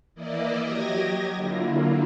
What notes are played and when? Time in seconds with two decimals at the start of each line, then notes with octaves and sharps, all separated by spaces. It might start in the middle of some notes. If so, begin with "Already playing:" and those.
0.15 E3 A#3 E4 D5 D#5
0.61 F#3 G4 D#5 G#6 A#6
1.35 D3 F#3 A#3 E4 F4